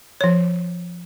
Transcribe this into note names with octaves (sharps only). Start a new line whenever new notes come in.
F3 C#5